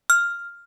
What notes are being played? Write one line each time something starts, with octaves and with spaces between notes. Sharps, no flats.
F6